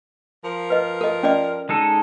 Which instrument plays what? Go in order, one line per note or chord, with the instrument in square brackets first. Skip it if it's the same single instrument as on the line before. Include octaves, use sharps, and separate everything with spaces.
[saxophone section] F3 A#4
[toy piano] B4 D#5
A4 D#5
C#4 D5 D#5
[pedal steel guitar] G#3 D#4 A4